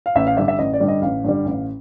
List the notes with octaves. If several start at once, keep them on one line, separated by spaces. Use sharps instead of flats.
F5
A1 E5
F5
G2 D3 G3 E5
E5
A1 D#5
D5
G2 D3 G3
D#5
A1 F5
G2 D3 G3
A1